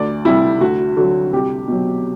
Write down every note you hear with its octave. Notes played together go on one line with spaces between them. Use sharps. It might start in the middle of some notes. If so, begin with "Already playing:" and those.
Already playing: D2 D5
C3 G3 E4
D2 F#4
D3 F#3 F#4
C2 G4
B2 F#3